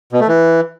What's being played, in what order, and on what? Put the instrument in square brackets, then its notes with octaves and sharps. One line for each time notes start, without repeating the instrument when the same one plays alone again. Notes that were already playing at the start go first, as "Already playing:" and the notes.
[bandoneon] B2
A3
E3